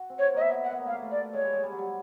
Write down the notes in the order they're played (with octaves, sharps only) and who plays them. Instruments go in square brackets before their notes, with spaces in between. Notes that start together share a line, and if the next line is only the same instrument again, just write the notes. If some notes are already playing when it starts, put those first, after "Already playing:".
Already playing: [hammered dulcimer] F#4
C4
[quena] C#5
[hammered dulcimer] A#3 [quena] D#5
[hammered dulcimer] B3 [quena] E5
[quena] F#5
[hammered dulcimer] B3
A#3
[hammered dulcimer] A3 [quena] F5
[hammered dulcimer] A#3
A3
[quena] D5
[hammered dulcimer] G#3 [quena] C#5
[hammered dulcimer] G3
G#3
G3
F#3
G3